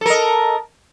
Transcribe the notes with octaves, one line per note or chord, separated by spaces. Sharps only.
A4 A#4 D#5